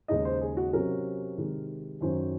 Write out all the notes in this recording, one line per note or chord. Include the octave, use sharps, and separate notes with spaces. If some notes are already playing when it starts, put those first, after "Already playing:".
D#2 C#3 G#3 D#4 D#5
C5
G#4
F#4
C3 F#3 C#4 A#4
C3 D#3 G#3
F#2 D#3 F#3 C#4 C5